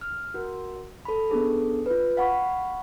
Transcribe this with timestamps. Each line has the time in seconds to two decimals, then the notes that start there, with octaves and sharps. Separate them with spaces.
0.01 F6
0.34 F#4 A#4
1.05 A4 B5
1.30 B3 C#4 D4 G#4 A4
1.86 F4 B4
2.17 F5 F#5 G#5 B5 C#6